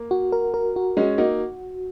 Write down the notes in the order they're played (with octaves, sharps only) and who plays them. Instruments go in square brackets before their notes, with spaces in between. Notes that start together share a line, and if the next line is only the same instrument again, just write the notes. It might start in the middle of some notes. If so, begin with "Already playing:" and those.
Already playing: [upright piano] A#3
[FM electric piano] F#4
A#4
A#4
F#4
[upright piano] G#3 C#4 [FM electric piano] F#4
[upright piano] A#3 D#4 [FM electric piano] F#4